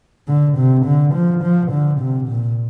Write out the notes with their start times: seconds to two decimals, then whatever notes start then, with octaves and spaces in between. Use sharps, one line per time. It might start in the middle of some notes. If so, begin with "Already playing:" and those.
0.28 D3
0.57 C3
0.85 D3
1.14 F3
1.43 F3
1.71 D3
2.00 C3
2.29 A#2